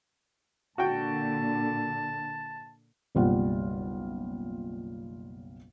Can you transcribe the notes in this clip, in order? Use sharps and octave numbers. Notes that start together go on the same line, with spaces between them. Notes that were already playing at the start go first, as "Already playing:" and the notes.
A#2 D3 F#4 G5 A5
F#1 B1 G3 F4 F#5